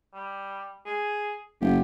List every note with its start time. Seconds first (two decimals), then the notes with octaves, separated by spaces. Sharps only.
0.14 G3
0.86 G#4
1.61 F#1 G4